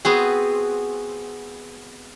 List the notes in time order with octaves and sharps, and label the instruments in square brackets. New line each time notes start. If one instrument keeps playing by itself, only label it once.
[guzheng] B3 C4 F#4 G#4